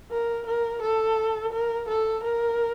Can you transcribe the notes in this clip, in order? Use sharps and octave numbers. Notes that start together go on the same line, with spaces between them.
A#4
A#4
A4
A#4
A4
A#4